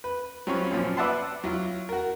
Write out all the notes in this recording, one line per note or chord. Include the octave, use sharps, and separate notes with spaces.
B4
F#3 G3 C4 C#4 F4 C#5
F#2 A#2 F3
B4 D5 E5 F#5 A5 C6
F#3 E4 F4
F#4 A#4